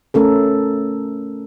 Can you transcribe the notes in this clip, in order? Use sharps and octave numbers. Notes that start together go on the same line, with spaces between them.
A3 C#4 A4 A#4